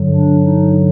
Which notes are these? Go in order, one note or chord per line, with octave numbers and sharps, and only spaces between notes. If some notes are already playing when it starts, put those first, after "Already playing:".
Already playing: G2 D3 F#3
D4
D#4